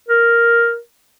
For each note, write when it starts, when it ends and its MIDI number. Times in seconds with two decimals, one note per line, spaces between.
0.08 0.76 70